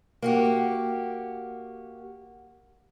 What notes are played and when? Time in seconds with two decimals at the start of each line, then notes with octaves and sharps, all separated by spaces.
0.22 A#3 F#4 G4